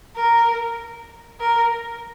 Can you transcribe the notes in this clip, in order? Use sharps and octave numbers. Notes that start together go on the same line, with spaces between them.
A#4
A#4